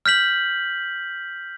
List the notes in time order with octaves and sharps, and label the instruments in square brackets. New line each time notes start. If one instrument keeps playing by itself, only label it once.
[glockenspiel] F6 G6 B6 F#7